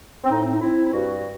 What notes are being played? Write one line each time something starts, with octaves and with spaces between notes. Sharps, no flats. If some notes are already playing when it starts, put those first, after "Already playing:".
C4
A2 D#4
C4
D#4
C4 E4
E4
G2 F#4